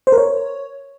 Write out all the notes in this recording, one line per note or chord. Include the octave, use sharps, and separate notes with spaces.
C5
A#4
C#5